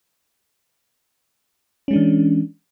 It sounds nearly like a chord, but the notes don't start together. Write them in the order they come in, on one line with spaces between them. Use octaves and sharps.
C#4 G#3 D4 E3